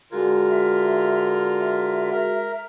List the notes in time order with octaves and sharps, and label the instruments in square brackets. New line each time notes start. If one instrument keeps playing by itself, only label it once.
[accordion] D3 F4 A#4 [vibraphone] G#3 F#4 G#4
[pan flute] E5
E5
[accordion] A#4